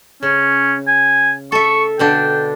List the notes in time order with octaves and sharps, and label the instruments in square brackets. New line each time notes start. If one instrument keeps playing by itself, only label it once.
[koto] C#3 [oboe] C#4
[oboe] G#5
[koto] A4 E5 [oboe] C#6
[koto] B2 D3 D4 [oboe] G5